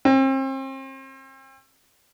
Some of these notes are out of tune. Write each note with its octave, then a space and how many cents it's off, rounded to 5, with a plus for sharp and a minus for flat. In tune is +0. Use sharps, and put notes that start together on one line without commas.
C4 +40